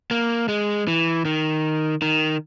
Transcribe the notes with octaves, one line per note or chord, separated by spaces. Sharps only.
A#3
G#3
E3
D#3
D#3